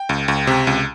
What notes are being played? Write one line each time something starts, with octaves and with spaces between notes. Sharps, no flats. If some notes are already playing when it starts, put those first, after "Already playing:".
Already playing: G5
C#2
C#2
C3
C#2